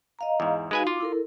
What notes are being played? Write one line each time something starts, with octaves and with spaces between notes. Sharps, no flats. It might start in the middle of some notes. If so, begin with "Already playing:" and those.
D#5 F5 A#5
E2 G#2
G#3 D#4 F#4 B4 F5 G#5
F4 D6
E4 A4 A#4